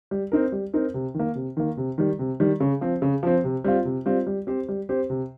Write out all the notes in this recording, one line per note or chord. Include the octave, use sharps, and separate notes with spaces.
G3
C4 D#4 A#4
G3
C4 D#4 A#4
C3
D#3
A#3
C3
D#3 A#3
C3
D#3 G3
C3
D#3 G3
C#3
F3 C4
C#3
F3 C4
C3
G3 C4 F4
C3
G3 C4 F4
G3
C4 G4 C5
G3
C4 G4 C5
C3